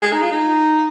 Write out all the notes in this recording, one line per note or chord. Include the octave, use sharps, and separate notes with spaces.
G#3
D#4
F4
D#4